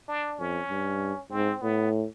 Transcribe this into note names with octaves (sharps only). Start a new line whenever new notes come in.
D4
F2 C#4
G2
G#2 C4
A2 B3